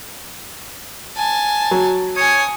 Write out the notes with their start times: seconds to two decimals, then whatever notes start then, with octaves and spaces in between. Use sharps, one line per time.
1.16 G#5 A5
1.71 F#3
2.17 C#5 G#5 D#6